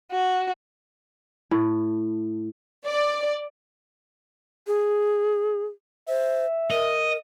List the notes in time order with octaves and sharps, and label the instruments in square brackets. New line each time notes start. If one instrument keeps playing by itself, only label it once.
[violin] F#4
[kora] A2
[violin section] D5
[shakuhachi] G#4
[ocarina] C5 [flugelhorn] E5
[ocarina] A#4 [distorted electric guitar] D#5